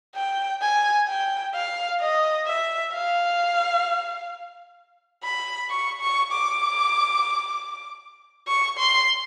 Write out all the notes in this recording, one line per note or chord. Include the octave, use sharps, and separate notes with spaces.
G5
G#5
G5
F5
D#5
E5
F5
B5
C#6
C#6
D6
C#6
C6